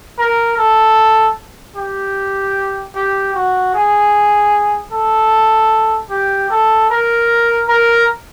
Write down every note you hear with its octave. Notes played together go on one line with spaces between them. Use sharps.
A#4
A4
G4
G4
F#4
G#4
A4
G4
A4
A#4
A#4